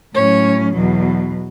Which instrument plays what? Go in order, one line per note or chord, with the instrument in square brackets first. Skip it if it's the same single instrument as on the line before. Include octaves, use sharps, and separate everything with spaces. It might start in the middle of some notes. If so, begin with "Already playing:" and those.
[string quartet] A2 F#3 C#4 C#5
E2 B2 F#3